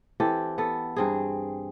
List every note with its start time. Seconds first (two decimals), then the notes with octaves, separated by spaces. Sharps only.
0.20 E3 C4 G4 A4
0.58 B3 A4
0.96 G2 C4 G#4